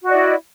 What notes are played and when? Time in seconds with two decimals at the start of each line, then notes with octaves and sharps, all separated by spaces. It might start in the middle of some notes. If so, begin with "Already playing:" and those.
0.02 F#4
0.06 D#5
0.09 D5
0.12 E4